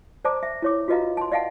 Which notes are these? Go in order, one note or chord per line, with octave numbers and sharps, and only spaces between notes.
C5 D5 A5 A#5 D6
E5
E4 C#5 D6
F4 F#4 B4 D#5 F5 A#5
A5 C6
D5 D#5 F5 F#5 A5